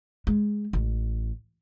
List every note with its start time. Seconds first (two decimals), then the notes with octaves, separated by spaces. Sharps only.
0.27 G#3
0.73 A1